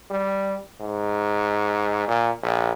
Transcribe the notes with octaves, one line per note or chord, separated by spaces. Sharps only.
G3
G#2
A#2
A#1